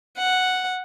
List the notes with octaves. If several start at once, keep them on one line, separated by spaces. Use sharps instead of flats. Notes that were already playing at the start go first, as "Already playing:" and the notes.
F#5